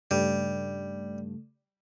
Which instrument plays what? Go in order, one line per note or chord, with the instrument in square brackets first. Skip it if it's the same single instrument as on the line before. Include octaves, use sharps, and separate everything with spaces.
[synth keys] G2 [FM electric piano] C#3 A3 [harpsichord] G3